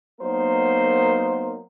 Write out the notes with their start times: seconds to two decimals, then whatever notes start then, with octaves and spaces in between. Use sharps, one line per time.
0.21 F#3 A#3 B3 D#4 A#4 C5